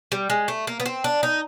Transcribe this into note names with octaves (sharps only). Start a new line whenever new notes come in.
G3
G#3
A3
A#3
B3
C4
D4
D#4